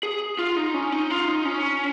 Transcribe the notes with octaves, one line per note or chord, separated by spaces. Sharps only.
G#4
F4
D#4
C#4
D#4
F4
D#4
C#4